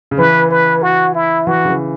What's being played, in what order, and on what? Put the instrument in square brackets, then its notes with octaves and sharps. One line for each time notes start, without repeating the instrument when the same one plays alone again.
[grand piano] C#3
[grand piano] E3 [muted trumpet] B4
[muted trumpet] B4
F#4
E4
[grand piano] E3 [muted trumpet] F#4
[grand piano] C#3
E3